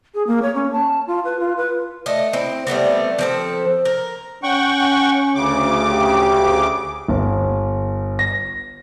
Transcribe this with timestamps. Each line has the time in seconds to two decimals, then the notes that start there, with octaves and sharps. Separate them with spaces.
0.14 G#4
0.27 A#3
0.42 C#5
0.55 C#4
0.72 A5
1.07 F4
1.25 B4
1.40 F4
1.57 B4
2.06 A3 D#5
2.33 C4 E4
2.67 G3 A3 B3 C4
3.19 F3 C4 A4
3.85 A#4
4.43 C#4 F#5 G5 C#6
5.35 D2 C#3 D6
5.91 G4
7.08 G1
8.19 A#6